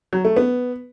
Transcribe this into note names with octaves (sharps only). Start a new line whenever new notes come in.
F#3
A3
B3